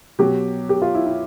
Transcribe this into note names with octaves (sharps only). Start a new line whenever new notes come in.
B2 F#3 G4
G4
F4
E4
E4